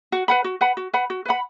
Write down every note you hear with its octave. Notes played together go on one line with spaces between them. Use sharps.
F#4
B4 F#5 B5
F#4
B4 F#5 B5
F#4
B4 F#5 B5
F#4
B4 F#5 B5